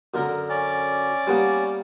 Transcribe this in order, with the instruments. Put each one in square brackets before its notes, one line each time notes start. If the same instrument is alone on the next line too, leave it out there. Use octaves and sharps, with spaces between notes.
[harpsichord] F#2 D3 A#4
[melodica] C#4 D5
[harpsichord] G3 A#3 B3